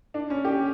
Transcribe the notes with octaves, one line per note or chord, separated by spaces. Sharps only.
D4
C#4
G4